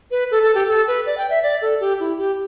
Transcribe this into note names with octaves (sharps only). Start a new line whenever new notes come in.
B4
A4
A4
G4
A4
B4
D5
G5
E5
D5
A4
G4
E4
G4